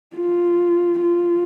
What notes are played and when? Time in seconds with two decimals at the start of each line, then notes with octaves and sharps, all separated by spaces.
0.16 F4
1.01 F4